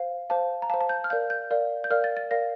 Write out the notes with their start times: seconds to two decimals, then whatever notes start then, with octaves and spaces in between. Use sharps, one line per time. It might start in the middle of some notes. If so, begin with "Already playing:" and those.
Already playing: C5 F5
0.30 C5 F5 A5
0.62 A#5
0.70 C5 F5 A5
0.81 A5
0.89 G6
1.04 F6
1.10 A#4 D5 F5 G6
1.30 G6
1.51 A#4 D5 F5
1.84 G6
1.90 A#4 D5 F5 F6
2.04 A6
2.17 A6
2.31 A#4 D5 F5 A#6